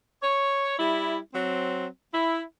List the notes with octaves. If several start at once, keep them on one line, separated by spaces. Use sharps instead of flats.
C#5
G3 E4
F#3 C4
E4